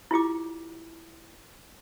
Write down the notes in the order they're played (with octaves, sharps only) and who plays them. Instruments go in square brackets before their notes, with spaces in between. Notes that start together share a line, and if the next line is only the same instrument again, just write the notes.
[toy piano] E4 F4 G4 D6